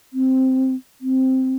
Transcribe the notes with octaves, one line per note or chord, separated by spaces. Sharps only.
C4
C4